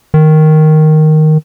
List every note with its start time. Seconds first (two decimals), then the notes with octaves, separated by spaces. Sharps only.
0.14 D#3